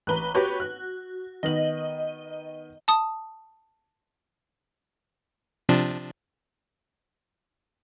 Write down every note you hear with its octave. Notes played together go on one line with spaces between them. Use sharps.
A1 B4 A#5 F#6 G7
F#4 G4 B4 C#5
F#6
D#3 B3 D#5 F#7
A5 D#6
C3 F3 D4